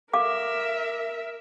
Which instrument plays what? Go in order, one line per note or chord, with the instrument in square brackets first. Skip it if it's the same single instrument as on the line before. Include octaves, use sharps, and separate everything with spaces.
[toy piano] A4 F5 D6 [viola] A#4 E5